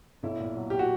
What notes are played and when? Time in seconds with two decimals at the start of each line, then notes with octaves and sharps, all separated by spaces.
0.23 B1 E4
0.40 A#2
0.56 F#3
0.70 G4
0.79 F#4